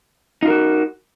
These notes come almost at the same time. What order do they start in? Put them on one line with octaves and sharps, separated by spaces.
D#4 F4 A#4 F#4